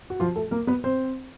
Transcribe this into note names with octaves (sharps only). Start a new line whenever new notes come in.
F#4
F3 F4
A3 A4
A#3 A#4
B3 B4
C4 C5